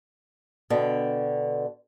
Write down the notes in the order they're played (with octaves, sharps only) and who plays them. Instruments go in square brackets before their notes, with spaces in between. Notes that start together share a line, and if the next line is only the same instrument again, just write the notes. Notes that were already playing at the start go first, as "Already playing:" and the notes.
[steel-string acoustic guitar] B2 D3 G5